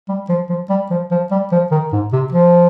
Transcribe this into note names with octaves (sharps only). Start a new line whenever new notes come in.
G3
F3
F3
G3
F3
F3
G3
F3
D#3
G#2
C3
F3